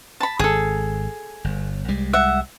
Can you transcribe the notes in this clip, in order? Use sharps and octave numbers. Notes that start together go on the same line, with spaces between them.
A5 B5
G#1 G#4 A4
G1
C2 G3 G#3
E5 F#5